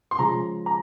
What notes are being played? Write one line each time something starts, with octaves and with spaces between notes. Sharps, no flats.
C6
C#3 F3 G#3 A#5
A#5